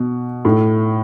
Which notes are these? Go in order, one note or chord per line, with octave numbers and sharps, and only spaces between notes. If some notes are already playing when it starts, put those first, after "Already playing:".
Already playing: B2
A2